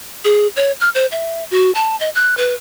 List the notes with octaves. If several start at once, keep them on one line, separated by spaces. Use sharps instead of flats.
G#4
C#5
F6
C5
E5
F#4
A5
D#5
F#6
B4